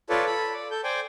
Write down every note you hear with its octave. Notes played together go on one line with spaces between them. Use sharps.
F4 A4 B4 C#5 D5
A4 B5
D5
A4 G6
C5 D5 G5 G#5